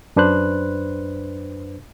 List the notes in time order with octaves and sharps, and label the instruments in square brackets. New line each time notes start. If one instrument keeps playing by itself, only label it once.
[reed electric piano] F#2 D4 B4 C5 F#6